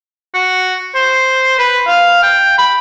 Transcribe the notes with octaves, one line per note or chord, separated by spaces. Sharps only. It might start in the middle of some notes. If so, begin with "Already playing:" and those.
F#4
C5
B4
F5
G5
B5